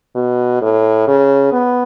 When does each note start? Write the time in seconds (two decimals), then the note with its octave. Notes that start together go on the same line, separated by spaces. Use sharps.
0.16 B2
0.62 A2
1.08 C#3
1.52 B3